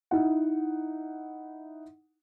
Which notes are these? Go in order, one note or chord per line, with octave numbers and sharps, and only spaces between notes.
D#4 E4 F#5